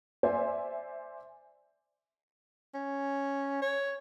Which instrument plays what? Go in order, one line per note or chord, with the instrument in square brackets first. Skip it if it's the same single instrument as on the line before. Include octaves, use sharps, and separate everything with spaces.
[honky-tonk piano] C5 D5 E5 G#5
[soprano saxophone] C#4
C#5